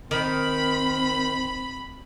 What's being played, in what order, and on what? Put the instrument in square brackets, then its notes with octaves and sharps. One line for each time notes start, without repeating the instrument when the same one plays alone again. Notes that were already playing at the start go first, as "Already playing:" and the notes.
[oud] D#3 [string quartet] C4 [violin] B5